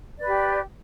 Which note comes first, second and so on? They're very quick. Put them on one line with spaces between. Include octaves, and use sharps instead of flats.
D5 B4 G4